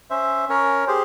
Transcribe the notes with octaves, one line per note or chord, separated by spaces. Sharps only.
C#4 C5 E5
C#4 A#4 C#5
G4 G#4 C5